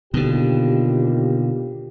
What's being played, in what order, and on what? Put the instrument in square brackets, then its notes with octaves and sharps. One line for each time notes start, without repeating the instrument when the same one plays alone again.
[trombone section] D#2 F4 G4 [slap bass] B2 D3